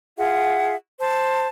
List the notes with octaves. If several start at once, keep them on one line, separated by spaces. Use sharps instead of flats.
F4 G#4 E5 F#5
C5 A5